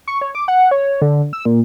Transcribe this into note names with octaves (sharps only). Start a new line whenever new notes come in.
C#6
C#5
D6
F#5
C#5
D3
E6
A#2